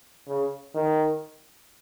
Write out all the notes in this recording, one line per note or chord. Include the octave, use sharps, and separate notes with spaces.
C#3
D#3